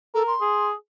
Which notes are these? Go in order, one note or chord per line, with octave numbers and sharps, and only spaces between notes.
A4 A#4
C6
G#4